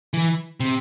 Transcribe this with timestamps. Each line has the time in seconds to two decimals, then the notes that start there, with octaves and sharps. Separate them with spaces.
0.14 E3
0.60 C3